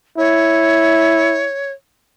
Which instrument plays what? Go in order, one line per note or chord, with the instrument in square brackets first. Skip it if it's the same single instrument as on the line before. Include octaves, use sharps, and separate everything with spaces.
[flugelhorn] E4 [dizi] C#5